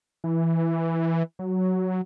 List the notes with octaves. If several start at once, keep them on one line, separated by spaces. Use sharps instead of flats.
E3
F#3